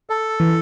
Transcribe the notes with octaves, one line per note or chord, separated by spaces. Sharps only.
A4
E3